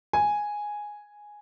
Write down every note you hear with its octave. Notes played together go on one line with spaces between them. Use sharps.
G#5